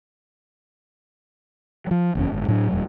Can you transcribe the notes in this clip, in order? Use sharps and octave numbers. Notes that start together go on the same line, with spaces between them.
F3 F#3
F#1 E2 A#2 C#4
G1 G#2
A2 F#3 D4
D#1 F2 G3